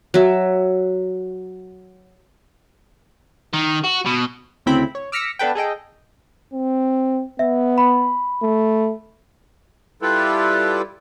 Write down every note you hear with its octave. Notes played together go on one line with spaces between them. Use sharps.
F#3 E5
D#3
F#4
B2
D2 C#3 C4 E4 G5 B5
C#5
D6 E6 F6 A#6 B6 C#7
B3 D4 A4 B4 G5
G#4 A4 D#5 G5
C4
B3 E5
B5
A3
G3 E4 F4 G4 A4 B4